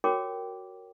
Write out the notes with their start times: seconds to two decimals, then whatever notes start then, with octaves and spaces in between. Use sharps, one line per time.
0.04 F#4 G4 A#4 C#5 G5 D6